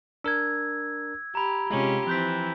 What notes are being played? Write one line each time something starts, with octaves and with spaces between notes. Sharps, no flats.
D4 A#4 E6 G#6
G4 A#5 B5
C3 G#3 C#4 F4 G4
E3 F3 C4 F#6 G6 B6